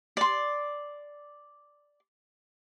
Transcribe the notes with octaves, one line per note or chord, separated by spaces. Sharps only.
D5 C6